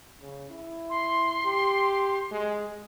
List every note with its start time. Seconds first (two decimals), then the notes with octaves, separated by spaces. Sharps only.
0.22 C#3
0.50 E4
0.90 C6
1.45 G4
2.32 G#3